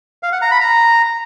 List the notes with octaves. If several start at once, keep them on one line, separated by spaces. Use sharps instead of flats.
F5
F#5
A#5
B5
A#5